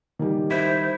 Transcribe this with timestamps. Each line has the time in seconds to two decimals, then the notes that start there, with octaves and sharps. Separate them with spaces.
0.19 D#3 G3
0.51 E4 C5